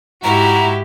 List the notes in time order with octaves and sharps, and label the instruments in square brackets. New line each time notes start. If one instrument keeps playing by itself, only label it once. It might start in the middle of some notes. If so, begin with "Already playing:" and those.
[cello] G#2 G4 [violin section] E4 F#4 [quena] A#5